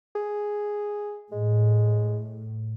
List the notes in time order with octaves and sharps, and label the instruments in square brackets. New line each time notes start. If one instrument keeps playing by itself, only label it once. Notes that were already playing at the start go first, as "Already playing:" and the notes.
[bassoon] G#4
[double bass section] A2 [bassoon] G#3